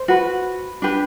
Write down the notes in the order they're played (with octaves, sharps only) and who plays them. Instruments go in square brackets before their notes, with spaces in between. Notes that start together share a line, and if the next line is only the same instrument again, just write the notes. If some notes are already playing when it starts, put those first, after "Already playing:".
Already playing: [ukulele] C5
F#4 B4
D4 G4 B4